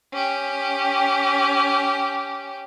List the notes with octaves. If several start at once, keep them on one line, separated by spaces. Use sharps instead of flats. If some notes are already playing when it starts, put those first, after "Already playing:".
C#4 G4